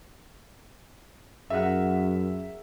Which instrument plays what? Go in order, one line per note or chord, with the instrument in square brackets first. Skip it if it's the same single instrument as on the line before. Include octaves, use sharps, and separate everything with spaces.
[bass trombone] F#2 [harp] G#4 A#4 F#5 [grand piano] E5